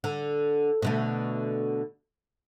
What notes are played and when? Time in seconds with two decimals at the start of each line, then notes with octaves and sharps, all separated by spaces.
0.04 D3
0.82 B2 D3 A3